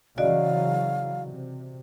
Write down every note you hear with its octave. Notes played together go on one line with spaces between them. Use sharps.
C#3 E3 F#3 F#4 D5 D#5 F5
C3